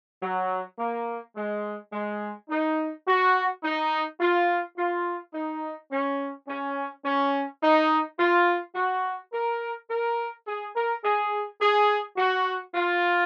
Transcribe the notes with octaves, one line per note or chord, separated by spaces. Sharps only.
F#3
A#3
G#3
G#3
D#4
F#4
D#4
F4
F4
D#4
C#4
C#4
C#4
D#4
F4
F#4
A#4
A#4
G#4
A#4
G#4
G#4
F#4
F4